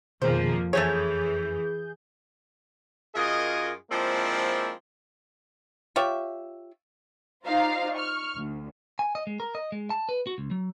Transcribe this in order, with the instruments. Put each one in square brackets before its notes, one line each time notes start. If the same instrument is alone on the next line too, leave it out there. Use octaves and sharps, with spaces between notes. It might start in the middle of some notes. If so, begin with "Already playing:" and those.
[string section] F2 F3 A#3 [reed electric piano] B2 D#3 G#4 [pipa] C5
[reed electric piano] F2 A6 [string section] E3 [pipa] A3 C#4 C#5 [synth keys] G#4 G6
[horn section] F#2 F4 G#4 A#4 D#5
F3 G#3 A#3 C4 D4 E4
[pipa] F4 G4 C#5 E5
[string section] D#4 F4 C5 D5 F5 A#5
C#6 F6
D2
[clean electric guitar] G#5
D#5
G#3
A#4
D#5
G#3
A5
B4
F#4
C#2
F#3